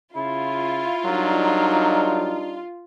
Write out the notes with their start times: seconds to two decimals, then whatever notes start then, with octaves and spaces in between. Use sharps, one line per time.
0.16 C#3 E4 F4
1.05 F#3 G3 D4 D#4 A#4